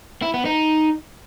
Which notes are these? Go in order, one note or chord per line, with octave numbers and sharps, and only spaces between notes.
E4
B3
D#4